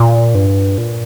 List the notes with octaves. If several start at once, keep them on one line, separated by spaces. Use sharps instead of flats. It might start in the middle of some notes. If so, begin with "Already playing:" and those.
Already playing: A#2
G2
A#2